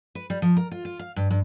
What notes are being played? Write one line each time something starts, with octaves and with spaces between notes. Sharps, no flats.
B4
G3
F3
A#4
F4
F4
F5
G2
G2